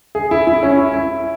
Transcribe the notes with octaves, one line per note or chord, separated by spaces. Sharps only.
G#4
E4
E4
C#4
E4
E4